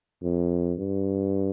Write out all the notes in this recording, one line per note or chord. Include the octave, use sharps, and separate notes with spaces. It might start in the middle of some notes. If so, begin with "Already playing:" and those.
F2
G2